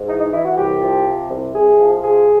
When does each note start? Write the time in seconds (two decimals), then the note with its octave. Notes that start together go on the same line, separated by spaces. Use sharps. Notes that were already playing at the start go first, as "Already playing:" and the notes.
Already playing: G#2
0.08 E3 D#4
0.21 D#4
0.32 E3 E4
0.45 F#4
0.57 C2 G4
0.81 F3
1.05 C3
1.30 C2
1.53 C2 G#4
1.78 F3
2.02 C3 G#4